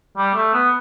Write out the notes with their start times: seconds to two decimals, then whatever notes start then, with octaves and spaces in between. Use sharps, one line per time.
0.17 G3
0.35 A3
0.53 B3